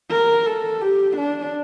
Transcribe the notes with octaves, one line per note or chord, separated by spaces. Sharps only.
A#4
A4
G4
D4